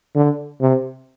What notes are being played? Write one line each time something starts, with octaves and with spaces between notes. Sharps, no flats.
D3
C3